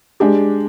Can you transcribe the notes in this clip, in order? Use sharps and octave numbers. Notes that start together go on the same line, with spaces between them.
G#3 D4 G4